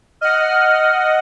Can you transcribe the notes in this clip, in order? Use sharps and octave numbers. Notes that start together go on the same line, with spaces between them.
D#5 F#5 F6